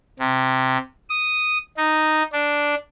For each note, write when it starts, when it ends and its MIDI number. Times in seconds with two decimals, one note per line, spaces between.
0.20 0.78 48
1.09 1.58 87
1.77 2.23 63
2.33 2.75 62